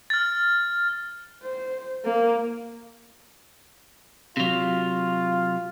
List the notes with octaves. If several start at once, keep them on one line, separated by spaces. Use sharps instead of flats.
F6 A6
C5
A#3
C3 F#3 F4